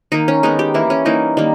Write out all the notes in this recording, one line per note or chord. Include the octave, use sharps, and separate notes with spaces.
D#3 A#3 D#4
C#4
D#3 G#3 B3 D#4
G4
E3 A#3 E4
C#4
E3 G3 A#3 D#4
D#3 G3 A#3